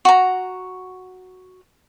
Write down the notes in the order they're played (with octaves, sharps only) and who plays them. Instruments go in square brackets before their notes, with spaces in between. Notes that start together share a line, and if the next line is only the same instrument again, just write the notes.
[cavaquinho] F#4 A#5